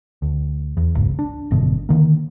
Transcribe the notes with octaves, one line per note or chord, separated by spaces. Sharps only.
D2
E2
G1 C#2 G#2
D4
G#1 F#2 B2 D3
D3 D#3 A#3